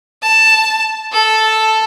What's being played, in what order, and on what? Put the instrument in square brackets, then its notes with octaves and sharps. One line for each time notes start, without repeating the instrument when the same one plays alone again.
[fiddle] A5
A4